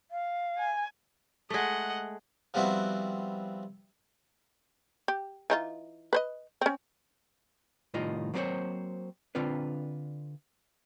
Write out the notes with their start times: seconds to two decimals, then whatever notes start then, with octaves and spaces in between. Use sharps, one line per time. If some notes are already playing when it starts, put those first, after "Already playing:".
0.11 F5
0.58 G#5
1.50 G#3 A3 D#5 F#5
2.54 F3 G3 B3 C4 E4 F#4
5.08 G4
5.50 E3 D#4 F4
6.13 B4 C5 D#5
6.61 C4 C#4
7.94 C2 A2 D#3 F4 D#5
8.34 F#3 A#3 C4 F4 C5 C#5
9.35 D3 C4 D4 F4 B4